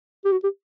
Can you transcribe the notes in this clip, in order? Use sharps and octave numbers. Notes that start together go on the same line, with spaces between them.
G4
F#4
G4